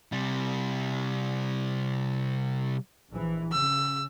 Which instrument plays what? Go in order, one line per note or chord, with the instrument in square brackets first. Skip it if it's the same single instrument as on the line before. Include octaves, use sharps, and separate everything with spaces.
[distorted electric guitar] C3 G3
[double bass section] A#1 E3
[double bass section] C#3 [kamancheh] E6